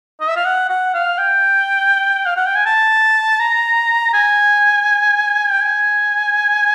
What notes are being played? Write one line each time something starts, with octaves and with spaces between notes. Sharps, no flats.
D#5
E5
F5
F#5
F#5
F5
G5
F5
F#5
G5
G#5
A5
A#5
G#5
G5
G#5